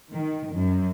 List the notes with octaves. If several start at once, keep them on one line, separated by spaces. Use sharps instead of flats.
D#3
F#2